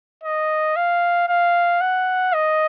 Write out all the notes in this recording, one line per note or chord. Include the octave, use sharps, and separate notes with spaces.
D#5
F5
F5
F#5
D#5